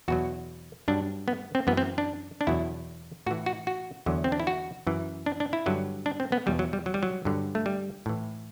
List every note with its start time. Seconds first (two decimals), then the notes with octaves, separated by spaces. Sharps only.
0.08 E2 B2 F#3 F#4
0.88 G2 F#3 D4
1.28 B3
1.55 C4
1.67 F#2 E3 B3
1.77 C4
1.98 D4
2.41 D4
2.47 E2 B2 F#3 E4
3.26 A2 F#4
3.31 E3
3.46 F#4
3.67 F#4
4.06 E2 D3 F#3
4.24 C4
4.32 D4
4.40 E4
4.47 F#4
4.87 F#2 E3
5.26 D4
5.40 D4
5.53 E4
5.66 G2 D3 F#3
6.06 D4
6.20 C4
6.32 B3
6.46 E2 B2 F#3 G3
6.59 F#3
6.73 G3
6.86 F#3
6.94 G3
7.03 F#3
7.25 G2 D3 F#3
7.55 A3
7.66 G3
8.06 A2 E3